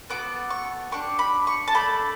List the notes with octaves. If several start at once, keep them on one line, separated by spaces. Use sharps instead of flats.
B3 F#4 A4 D6
C#6
D4 G4 C#6
B5
C#6
A5
A3 D4 A4 B5